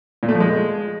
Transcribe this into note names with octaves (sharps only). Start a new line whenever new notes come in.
A#2
A3
F3
G#3